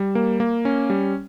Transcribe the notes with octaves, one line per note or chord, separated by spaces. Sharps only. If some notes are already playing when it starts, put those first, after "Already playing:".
Already playing: G3
A#3
A#3
C#4
G3